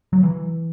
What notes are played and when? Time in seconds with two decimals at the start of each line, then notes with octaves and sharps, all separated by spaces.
0.13 F#3
0.23 E3